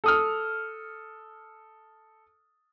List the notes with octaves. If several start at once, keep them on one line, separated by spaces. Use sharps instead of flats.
A4 D#6 F6